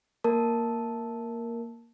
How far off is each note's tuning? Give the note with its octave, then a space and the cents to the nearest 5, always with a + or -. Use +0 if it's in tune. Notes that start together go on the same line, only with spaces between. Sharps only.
A#3 +0 A#4 +0 A5 +0